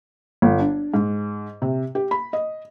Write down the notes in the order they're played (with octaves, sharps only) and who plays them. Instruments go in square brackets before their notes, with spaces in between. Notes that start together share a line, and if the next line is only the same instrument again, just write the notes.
[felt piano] G1
D4
G#2
C3
G4
B5
D#5